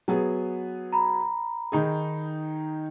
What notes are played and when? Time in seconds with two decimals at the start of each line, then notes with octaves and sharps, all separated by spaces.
0.08 F#3 B3 G#4
0.93 A#5 B5
1.72 D#3 D#4 G#4